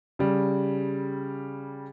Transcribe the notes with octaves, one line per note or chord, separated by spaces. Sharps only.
C#3 G3